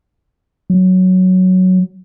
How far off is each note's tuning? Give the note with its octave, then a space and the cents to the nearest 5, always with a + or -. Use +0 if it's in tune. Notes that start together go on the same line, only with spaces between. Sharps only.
F#3 +0